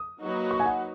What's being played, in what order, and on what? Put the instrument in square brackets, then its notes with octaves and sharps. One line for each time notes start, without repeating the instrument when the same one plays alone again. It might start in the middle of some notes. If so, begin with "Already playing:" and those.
Already playing: [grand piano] D#6
[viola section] F#3 A#3 D#4 F#4 B4
[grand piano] C#6
G#5
F#5